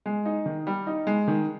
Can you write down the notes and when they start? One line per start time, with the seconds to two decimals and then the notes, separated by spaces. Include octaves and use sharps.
0.06 G#3
0.25 D#4
0.46 D#3
0.67 G3
0.87 D#4
1.07 G#3
1.28 D#3